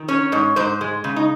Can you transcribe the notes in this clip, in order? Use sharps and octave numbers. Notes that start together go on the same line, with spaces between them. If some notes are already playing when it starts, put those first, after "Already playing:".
Already playing: D#3
C#4 C#5
G#2 C#5
G#2 C5
G#3
C#3
D#4